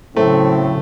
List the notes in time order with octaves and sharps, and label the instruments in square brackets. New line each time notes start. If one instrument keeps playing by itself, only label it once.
[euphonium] A2 [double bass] C#3 F#3 [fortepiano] A3 [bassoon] C4